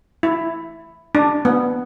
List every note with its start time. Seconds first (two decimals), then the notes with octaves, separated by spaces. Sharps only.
0.23 E4
1.15 D4
1.45 B3